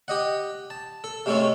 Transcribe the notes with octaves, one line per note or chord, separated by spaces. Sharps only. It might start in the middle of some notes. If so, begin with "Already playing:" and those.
G4 D#5 F#5
A5
A4
C3 G#3 A3 C#4 A4